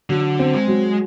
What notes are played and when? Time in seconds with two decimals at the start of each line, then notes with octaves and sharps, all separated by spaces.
0.10 D3 F#3
0.39 C4
0.54 G#3
0.68 F#3